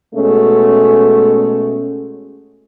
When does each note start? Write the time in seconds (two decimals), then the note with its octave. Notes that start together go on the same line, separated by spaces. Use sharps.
0.15 B2 G#3 A3 C#4